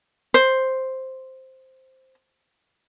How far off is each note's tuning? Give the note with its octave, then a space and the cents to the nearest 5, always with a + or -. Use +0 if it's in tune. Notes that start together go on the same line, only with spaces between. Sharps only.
C5 +0